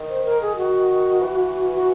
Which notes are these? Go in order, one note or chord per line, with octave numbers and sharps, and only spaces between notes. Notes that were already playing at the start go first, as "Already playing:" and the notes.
Already playing: D#3
C5
A#4
G#4
F#4
E3
F#4